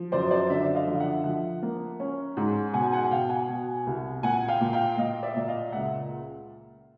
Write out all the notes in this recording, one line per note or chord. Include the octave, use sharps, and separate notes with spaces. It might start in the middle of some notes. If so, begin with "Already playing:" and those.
Already playing: F3
F#2 C5 D5
C5 D5
D3 D5 E5
D#5 F5
F3
F5
E5 F#5
F3 E5 F#5
A#3
C#4
G#2
B2 F#5 G#5
F#5 G#5
G#5
B2 F5 G5
F#5 G#5
B2
C2
A#2 F#5 G#5
F5 G5
A#2
F5 G5
A#2 D#5 F5
D5 E5
A#2
D#5 F5
C#2 E5 F#5